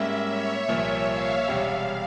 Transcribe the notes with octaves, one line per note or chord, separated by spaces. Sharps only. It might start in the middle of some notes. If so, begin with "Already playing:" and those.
Already playing: G#2 G3 A#3 C#4 E5
C#5
C2 A#2 F3 A#3 C#5
F5
E1 E2 C3 G3 F5